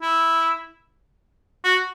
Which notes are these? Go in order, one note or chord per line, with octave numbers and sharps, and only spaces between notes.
E4
F#4